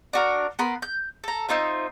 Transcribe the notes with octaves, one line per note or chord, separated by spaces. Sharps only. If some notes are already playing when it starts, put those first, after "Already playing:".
D4 F#4 A#4
B3 A#4 B5 C6
G6
A4 A#5
C4 D#4 F4 E5